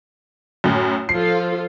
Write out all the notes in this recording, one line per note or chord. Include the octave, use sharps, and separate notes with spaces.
F#2 A2
F3 F4 A4 C7